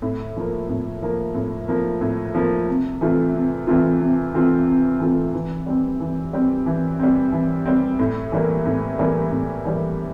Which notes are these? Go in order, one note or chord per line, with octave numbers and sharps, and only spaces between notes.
A2
F3 A#3
A2
F3 A#3
A2
F3 A#3
A2
F3 A#3
C3
E3 A3 C4 F4
C3
E3 A3 C4 F4
C3
E3 A3 C4 F4
C3
E3 A3 C4 F4
E3
G3 C4
E3
G3 C4
E3
G3 C4
E3
G3 C4
A2
E3 G3 A#3
A2
E3 G3 A#3
A2
E3 G3 A#3